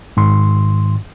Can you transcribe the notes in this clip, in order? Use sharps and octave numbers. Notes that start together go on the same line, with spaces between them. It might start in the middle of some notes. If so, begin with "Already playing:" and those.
G#2 D#3 C6